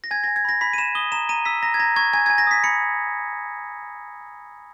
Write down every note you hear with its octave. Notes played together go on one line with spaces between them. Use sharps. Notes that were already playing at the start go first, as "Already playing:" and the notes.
A#6
G#5 G#6
G#5 A#6
G#6
B5 A#6
B5 B6
D#7
B5 E7
D#6 G7
A#5 E7
A#5 D#7
E6 B6
A#5 A#6
G#6
A#5 A#6
C#6 G#6
G#5 G#6
G#5 G#6
A#6
D#6 B6
B5 C#7